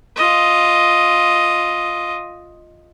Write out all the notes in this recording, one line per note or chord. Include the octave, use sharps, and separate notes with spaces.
F4 D#5